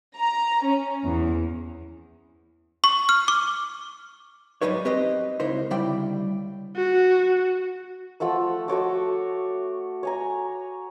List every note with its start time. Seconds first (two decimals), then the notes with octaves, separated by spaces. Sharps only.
0.17 A#5
0.64 C#4
1.05 E2
2.84 C#6
3.09 F6
3.28 D6
4.62 G#2 F#3 G3 D#4 B4 C#5
4.85 C4 G4 B4 D#5
5.40 C#2 D#4 E4 A#4 C5
5.71 D2 C#3 G3 E4 D5 G5
6.76 F#4
8.20 F3 A3 F#5 E6
8.68 A3 F#4 C#5 D6
10.03 C#5 G#5 A#5